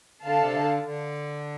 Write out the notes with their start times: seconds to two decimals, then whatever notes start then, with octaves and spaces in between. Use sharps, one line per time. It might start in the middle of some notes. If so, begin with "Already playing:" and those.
0.23 D3 D4 A4 F5 A5
0.39 C3
0.53 D3
0.83 D3